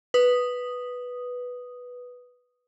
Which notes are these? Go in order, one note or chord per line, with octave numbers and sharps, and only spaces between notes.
B4 D#6